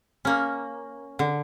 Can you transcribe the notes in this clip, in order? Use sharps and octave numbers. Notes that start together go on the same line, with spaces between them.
A#3 C#4
D3